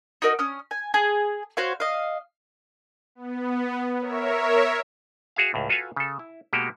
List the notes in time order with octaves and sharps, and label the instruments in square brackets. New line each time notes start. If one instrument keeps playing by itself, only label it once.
[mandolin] D#4 F#4 A#4 D#5
C#4 D#6 F6
G#5
G#4
F#4 C5 C#5 F5
D#5 F5
[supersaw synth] B3
A#4 C#5 E5
[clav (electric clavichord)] F#4 G#4 E5 F5
C#2 A2
F4 F#4 A4 B4 F5 G#5
C#3 A4
E4
B2 G#3 A#3 F#4 G4